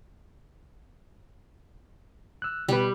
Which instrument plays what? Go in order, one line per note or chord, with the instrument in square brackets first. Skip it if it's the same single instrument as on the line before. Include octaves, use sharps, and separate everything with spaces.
[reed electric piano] E6 F#6
[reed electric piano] B2 B4 [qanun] G3